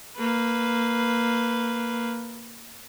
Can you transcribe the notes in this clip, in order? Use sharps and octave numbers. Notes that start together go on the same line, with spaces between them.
A#3 B4